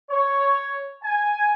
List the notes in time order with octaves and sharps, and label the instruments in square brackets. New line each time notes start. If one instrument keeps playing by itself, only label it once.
[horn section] C#5
G#5